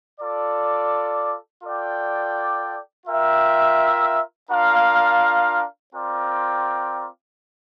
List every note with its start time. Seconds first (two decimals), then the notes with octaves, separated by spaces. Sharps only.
0.21 F4 A4 D5
1.64 F4 A4 D5 G5
3.07 F4 A#4 E5 G5
4.50 D4 F4 A#4 F5
5.93 C4 F4 A#4 D5 G5